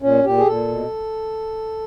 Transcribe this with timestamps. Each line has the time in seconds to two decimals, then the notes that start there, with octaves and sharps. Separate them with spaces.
0.02 A#2 C#4
0.24 A#2 G4
0.38 G#4
0.46 A#2 A4
0.68 B2